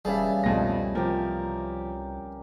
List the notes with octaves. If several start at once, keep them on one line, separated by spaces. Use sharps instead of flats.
E1 C#3 E3 G3 G#4 E5 A5
C2 F2 B2 A#6
C3 F3 G4 A#4